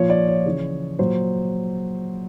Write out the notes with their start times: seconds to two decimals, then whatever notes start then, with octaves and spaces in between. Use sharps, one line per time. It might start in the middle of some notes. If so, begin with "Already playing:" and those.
Already playing: A#2 F3 C#5
0.10 D5
0.28 C#5
0.46 C#3 E3
0.99 A#2 F#3 C5